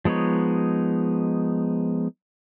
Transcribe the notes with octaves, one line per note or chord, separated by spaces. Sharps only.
F3 G#3 B3 D#4 C#5